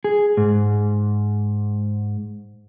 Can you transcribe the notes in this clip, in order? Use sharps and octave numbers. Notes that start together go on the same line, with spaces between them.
G#4
G#2